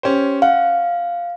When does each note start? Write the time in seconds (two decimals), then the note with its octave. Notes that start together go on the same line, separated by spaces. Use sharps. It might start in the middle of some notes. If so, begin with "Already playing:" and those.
0.03 C#4 G4 C5
0.42 F5 F#5